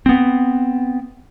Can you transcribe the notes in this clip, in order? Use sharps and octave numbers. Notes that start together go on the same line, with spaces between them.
B3 C4